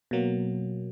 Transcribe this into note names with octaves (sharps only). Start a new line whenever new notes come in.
B2 F#3 A#3